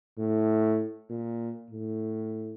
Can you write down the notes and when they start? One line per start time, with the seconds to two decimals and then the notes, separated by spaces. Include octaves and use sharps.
0.18 A2
1.10 A#2
1.71 A2